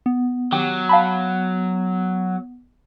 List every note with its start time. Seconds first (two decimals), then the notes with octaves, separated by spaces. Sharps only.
0.06 B3
0.52 D#3 F#3 G4
0.89 F5 A5 B5